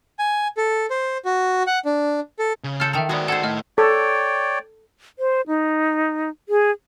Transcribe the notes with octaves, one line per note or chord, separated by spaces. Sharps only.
G#5
A4
C5
F#4
F#5
D4
A4
C#3
F4 A4 F6 G6 C#7
D#3 A4 E5 G5 A#5
G#3 B3 F#4 D5
A4 C5 F#5 A5 G#6
A2 D#5 F6
A4 C#5 D5 G5
C5
D#4
G#4